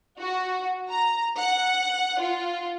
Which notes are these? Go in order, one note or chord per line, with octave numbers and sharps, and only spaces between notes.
F#4
A#5
F#5
F4